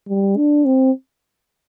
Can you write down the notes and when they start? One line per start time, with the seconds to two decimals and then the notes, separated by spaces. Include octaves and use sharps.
0.08 G3
0.37 D4
0.66 C4